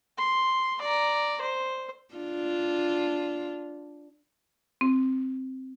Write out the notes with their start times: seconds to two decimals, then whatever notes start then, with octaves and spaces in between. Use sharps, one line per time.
0.18 C6
0.81 D5 A#5
1.41 C5
2.15 D4 F4
4.81 C4